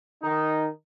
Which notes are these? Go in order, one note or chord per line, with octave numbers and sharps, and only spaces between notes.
D#3 D#4